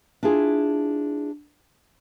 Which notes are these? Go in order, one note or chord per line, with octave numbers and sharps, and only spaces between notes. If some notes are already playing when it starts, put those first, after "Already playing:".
D4 E4 F4 G#4